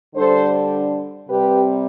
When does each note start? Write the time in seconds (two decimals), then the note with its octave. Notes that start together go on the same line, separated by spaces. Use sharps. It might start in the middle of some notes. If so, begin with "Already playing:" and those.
0.15 D3 G3 D4 A4 C5
1.27 C3 G3 C4 G4 B4